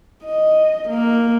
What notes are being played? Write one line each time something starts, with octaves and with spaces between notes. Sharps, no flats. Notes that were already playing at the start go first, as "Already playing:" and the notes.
D#5
A#3